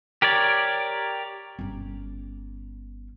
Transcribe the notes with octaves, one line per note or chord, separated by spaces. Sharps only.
G4 A#4 C#5 D5
G1 C#4